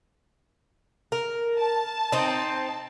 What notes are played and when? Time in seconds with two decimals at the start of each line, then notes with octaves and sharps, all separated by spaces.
1.12 A#4
1.60 A5
2.12 C4 D#4